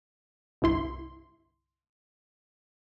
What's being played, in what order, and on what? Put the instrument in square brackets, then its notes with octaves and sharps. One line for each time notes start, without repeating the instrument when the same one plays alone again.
[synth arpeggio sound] G1 C2 E4 C6